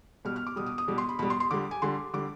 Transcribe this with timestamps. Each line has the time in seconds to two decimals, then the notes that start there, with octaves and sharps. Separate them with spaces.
0.25 B2 G3 F6
0.36 F6
0.47 D6
0.56 B2 G3 D#6
0.66 D#6
0.78 D#6
0.88 B2 G3
0.98 C6
1.09 B5
1.19 B2 G3 B5
1.30 C6
1.40 C6
1.51 D3 G3 D6
1.71 G#5
1.82 D3 G3 C6
2.13 D3 G3 D6